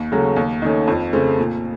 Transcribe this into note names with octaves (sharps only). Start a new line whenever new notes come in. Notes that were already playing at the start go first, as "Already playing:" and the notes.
Already playing: D#2
C#3 F#3 A3
D#2
D#3 A3 C#4
F2
C#3 A3 C4
A#2